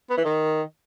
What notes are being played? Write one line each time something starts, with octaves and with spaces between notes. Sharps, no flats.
B3
E3
D#3